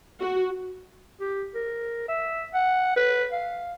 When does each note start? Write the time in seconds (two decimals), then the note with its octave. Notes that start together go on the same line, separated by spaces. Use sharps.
0.21 F#4
1.20 G4
1.55 A#4
2.08 E5
2.54 F#5
2.96 B4
3.32 F5